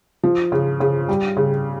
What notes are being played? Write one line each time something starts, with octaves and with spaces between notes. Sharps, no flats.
F3
C#3
C#3
G3
C#3